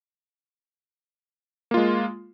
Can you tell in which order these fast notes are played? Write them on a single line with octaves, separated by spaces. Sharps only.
A#3 F4 G#3